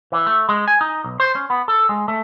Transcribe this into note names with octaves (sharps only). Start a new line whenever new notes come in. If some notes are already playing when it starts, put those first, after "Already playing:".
E3
A3
G#3
G#5
D#4
B1
C5
C#4
B3
A4
G#3
A3